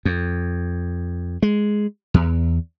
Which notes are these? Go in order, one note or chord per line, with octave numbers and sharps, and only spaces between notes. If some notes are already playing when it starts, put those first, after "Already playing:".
F2
G#3
E2